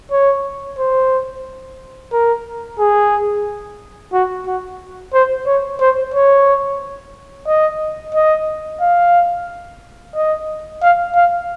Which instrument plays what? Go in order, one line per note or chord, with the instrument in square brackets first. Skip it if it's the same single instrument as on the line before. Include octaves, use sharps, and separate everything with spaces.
[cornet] C#5
C5
A#4
G#4
F#4
F#4
C5
C#5
C5
C#5
D#5
D#5
F5
D#5
F5
F5